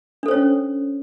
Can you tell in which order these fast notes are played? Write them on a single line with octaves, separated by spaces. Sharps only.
D4 A4 C5 C#5 C#4